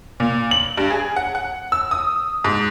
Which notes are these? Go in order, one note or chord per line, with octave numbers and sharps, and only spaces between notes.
A#2
F#7
G2
G#4
F#5
F#5
E6
D#6
G#2